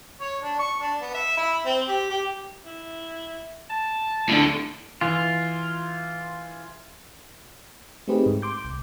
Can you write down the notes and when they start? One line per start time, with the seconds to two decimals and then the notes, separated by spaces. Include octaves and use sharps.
0.20 C#5
0.42 D4
0.59 C#6
0.80 D4
1.02 B3
1.14 E5
1.37 E4
1.66 C4
1.88 G4
2.10 G4
2.66 E4
3.70 A5
4.29 A2 D3
5.01 E3 F4
8.08 A3 C4 D#4 G4 G#4 B4
8.26 G#2
8.42 C6 D6 G6
8.65 C2